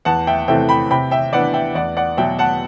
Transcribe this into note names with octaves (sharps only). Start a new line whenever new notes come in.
E2 F#5 A5
E5 G5
C3 E3 A3 C4 E5 G5
G5 B5
C3 G5 B5
E5 G5
E3 B3 D4 D5 F#5
E5 G5
E2 D5 F#5
D5 F#5
B2 F#3 E5 G5
F#5 A5